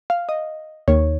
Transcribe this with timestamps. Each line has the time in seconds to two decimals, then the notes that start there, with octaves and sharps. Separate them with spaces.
0.10 F5
0.29 D#5
0.88 D#2 D#3 C#5